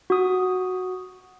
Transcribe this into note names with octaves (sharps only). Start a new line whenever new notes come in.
F#4 D#6